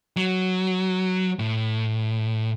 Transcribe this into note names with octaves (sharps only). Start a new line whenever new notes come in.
F#3
A2